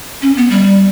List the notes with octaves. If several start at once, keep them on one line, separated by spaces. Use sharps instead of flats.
C#4
B3
G3